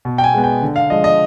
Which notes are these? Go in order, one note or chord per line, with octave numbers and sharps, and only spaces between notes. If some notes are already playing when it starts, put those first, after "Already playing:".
B2
G5
G#5
G#3 B3
G5
D3
F5
F3 G#3 D#5
D#5